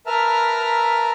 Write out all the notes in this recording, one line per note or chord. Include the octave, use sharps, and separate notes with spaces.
A#4 B4 E5 A5 A#5 F6